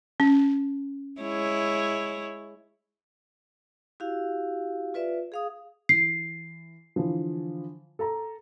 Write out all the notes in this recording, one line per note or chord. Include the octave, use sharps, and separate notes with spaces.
C#4
G#3 E4 C#5
E4 F#4 G4 F5
F4 B4 D5 E5
G#4 F5 D#6
E3 C7
D3 E3 F3
A4 A#5